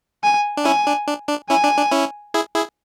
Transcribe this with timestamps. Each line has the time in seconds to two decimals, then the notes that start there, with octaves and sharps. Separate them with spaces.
0.24 G#5
0.57 D4
0.65 C#4 E4 G#5
0.87 D4
1.07 D4
1.29 D4
1.50 C#4 E4 G#5
1.64 D4
1.77 D4
1.92 C#4 E4
2.34 E4 G#4
2.55 E4 G#4